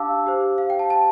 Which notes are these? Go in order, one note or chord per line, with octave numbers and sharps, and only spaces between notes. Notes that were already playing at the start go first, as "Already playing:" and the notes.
Already playing: D4 G4 F5 A5 D6 E6
G4 C5
F5
G5
A5
A5